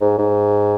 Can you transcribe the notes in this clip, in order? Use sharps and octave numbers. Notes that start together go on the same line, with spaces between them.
G#2
G#2